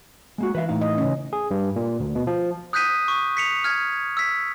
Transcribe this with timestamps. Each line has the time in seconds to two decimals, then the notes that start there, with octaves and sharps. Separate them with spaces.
0.38 G#3 A#3 F#4
0.55 E3 B4 E5 F5
0.69 A2 D#4 F5
0.81 D#5
0.98 C#3 C#4
1.33 G#4
1.51 G2
1.76 A#2
2.00 D2
2.15 B2
2.27 F3
2.73 D#6 F#6 G6 B6 D#7
3.08 C#6
3.37 B6 C#7 F7
3.64 F6 G#6
4.17 E6 B6